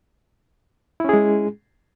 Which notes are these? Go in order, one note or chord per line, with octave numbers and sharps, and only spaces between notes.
G#3 C#4 E4 G#4